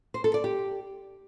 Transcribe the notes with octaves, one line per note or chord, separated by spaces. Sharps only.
C5
A4
D5
G4